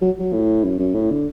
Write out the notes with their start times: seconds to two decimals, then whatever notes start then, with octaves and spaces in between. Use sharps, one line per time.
0.01 F#3
0.19 F#3
0.33 A2
0.64 F#2
0.79 F#2
0.94 A2
1.11 D3